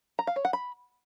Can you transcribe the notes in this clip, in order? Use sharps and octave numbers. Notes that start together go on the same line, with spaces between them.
A#5
F5
C#5
F#5
B5